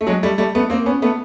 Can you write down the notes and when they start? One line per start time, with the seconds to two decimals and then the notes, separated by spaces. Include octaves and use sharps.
0.01 A3
0.07 F#3 G#3
0.23 G3 A3
0.38 G3 A3
0.55 A3 B3
0.70 A#3 C4
0.86 B3 C#4
1.02 A3 B3